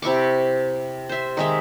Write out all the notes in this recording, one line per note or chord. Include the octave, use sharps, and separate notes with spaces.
C3 E4 C#6 D6
C5 E5
D#3 G#3 E5